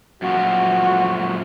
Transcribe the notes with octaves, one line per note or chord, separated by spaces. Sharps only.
F#2 A#2 F3 F#4